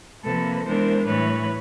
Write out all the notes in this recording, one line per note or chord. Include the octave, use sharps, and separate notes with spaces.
C3 F3 A#3 A4 B4
E3 G#3 B3 D4 A#4 C5
A2 E3 G3 B4 C#5